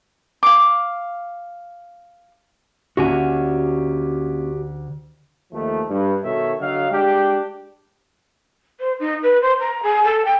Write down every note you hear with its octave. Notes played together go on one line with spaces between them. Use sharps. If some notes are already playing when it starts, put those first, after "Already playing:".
F5 D6
D2 A#3 C#4 F#4 G4 E5 G#5
D#2 D#3 F3 A3
G2
B2 D#3 A4 C#5 E5
D3 F#3 D#5 F5
G#3 D4 G4
C5
D#4
B4
C5
A#5
G#4
A4
G5